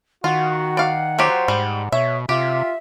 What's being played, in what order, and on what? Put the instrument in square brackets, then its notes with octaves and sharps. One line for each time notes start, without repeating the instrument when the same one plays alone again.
[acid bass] D#3 [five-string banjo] F4 [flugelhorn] F#4 [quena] F#5
[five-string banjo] D5 F5
[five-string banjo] F#3 F4 G4 [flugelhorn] C5
[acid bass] G#2 [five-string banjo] G3
[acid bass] B2 [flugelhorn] C#5 [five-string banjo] E5
[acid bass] C3 [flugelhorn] F4 [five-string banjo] G4 [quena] E5